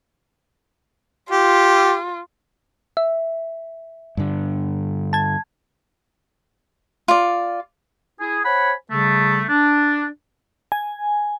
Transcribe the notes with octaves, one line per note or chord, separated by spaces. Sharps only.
F4 G4
E5
G2 D3
A5 G#6
F4 D5
E4 G#4
C5 C#5 F#5 G#5 B5
C#3 G3 A3
D4
G#5